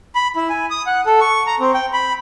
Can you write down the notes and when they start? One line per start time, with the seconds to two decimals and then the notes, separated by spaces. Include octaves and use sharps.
0.15 B5
0.36 E4
0.50 G#5
0.71 D#6
0.87 F#5
1.06 A4
1.21 C#6
1.47 A#5
1.60 C4
1.74 G5
1.93 B5